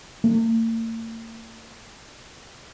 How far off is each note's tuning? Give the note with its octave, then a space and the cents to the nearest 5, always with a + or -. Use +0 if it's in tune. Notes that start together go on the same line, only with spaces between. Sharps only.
A#3 -45